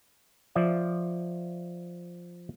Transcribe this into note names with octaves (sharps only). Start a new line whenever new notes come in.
F3 D5 E5